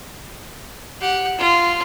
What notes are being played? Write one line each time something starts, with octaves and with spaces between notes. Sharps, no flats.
G4 F#5
F4